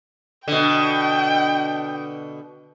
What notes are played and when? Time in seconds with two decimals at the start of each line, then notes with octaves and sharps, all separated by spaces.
0.48 B2 D3 G5